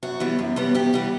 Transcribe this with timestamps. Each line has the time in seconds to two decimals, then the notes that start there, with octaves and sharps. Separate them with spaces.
0.03 F#2 F#4
0.20 E3 G3 B3
0.39 F#2
0.56 E3 G3 B3
0.74 F#2 G4
0.93 E3 G3 B3